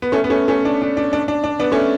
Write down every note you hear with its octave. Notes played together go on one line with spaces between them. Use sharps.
B3
A3 C#4
B3
A3 C#4
A3 C#4
D4
D4
D4
D4
D4
D4
B3 D4
A3 C#4